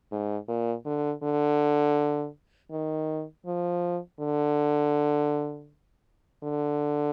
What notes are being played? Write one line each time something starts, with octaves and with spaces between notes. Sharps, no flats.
G#2
A#2
D3
D3
D#3
F3
D3
D3